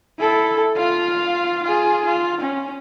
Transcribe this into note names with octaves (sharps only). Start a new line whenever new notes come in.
E4 A4
F4 F5
F4 G#4
F4
C#4